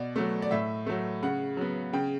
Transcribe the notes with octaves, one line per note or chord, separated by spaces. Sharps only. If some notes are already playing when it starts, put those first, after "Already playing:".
Already playing: B2 D5
F#3 A3
D5
A2 E5
F#3 A3
C#3 F#5
F#3 B3
C#3 G5